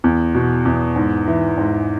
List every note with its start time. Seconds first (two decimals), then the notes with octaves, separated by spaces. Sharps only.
0.04 E2
0.35 B2
0.65 E2
0.96 G#2
1.28 E3
1.58 G#2